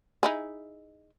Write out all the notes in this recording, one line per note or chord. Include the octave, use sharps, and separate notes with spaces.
D#4 E4 G#4